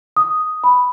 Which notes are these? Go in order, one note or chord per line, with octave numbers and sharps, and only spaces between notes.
D#6
B5